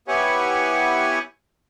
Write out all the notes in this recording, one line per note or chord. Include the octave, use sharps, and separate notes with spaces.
B3 E4 G4 C#5 F#5 G#5